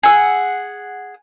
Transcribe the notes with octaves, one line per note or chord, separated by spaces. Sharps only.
G#4 F#5 E6